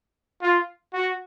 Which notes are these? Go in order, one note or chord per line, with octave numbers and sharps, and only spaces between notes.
F4
F#4